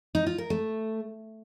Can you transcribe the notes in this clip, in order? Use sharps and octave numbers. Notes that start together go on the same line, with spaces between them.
D#4
F4
A#4
A3